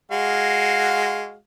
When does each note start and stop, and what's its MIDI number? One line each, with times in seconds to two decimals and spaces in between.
0.11 1.35 56
0.11 1.35 66
0.11 1.35 77